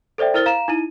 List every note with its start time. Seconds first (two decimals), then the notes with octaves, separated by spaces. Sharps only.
0.18 A4 C5 D5 E5 G5
0.34 E4 A#4 C5 F6 A6 G7
0.46 F5 A#5 E7
0.68 D#4 E4 D#7